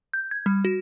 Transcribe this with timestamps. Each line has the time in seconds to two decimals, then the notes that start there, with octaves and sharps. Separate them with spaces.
0.14 G6
0.31 G#6
0.46 G3
0.65 F#4